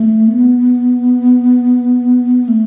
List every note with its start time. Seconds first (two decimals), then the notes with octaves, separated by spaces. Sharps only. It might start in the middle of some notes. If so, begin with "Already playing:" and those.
Already playing: A3
0.28 B3
2.48 A3